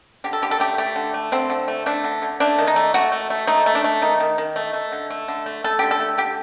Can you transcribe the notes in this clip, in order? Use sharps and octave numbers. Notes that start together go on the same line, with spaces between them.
D3 G4
A4
D3 G4
A4
A3 G4
A3 G4
D3
A3
D3 C4
D3
A3
A3 D4
D3
D3
A3 D4
D#3
D#4
A3
A3 F#4
A3
A3
A3 D#4
A3
D4
A3
D#3 D#4
D#3
D#3
A3
A3
D3
A3
D3
A3
A3 A4
D3 G4
A4
A3
D3 G4